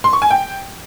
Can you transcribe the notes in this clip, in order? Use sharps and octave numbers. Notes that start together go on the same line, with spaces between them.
C6
C#6
G#5
G5